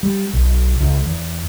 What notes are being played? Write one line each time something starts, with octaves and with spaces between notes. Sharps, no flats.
G3
B1
C#2
E2